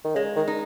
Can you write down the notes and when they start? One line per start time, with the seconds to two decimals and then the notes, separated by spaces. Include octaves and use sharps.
0.04 D#3
0.15 C#3 G#3
0.36 D#3
0.48 D#4